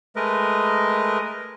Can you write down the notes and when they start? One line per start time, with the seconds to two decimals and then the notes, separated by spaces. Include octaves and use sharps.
0.16 G#3 A3 A#4 B4 D#5